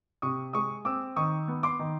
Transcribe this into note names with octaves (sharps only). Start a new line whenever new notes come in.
C3 C#6 D#6
G#3 C#6 D#6
C4 D6 E6
D#3 C#6 D#6
B3
C6 D6
D#3